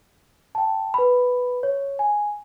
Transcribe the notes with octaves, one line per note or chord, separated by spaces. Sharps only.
G5 A5
B4 B5
C#5
G#5